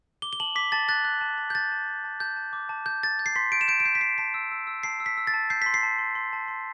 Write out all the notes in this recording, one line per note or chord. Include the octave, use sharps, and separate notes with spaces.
D6 G7
G7
A5 F#7
D6 B6
A5 A6
F#6 A6
F#6
A5
A5
G6
A5 A6
A5
A5
A5
A5 G6
A5
D6
A5
G6
G6 A6
G6
C7
C6 B6
G6 D7
E7
G6 D7
D7
G6 C7
B6
G6 C7
A5 B6
E6
E6
E6
A5 C7
E6
B6
E6
A6
A5
G6 C7
C6 B6
C7
A5
C6
C6
A5
C6